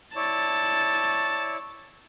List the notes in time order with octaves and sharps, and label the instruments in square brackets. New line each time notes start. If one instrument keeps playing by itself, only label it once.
[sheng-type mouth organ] E4 C#5 D5 [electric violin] A5